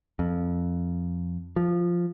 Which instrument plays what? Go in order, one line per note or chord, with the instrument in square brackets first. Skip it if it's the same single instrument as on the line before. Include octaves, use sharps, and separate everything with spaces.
[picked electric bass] F2
F3